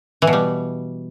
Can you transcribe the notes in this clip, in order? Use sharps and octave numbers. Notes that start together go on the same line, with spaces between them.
E3
B2
G3